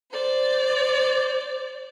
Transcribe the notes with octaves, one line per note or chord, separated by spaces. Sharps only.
C5 D5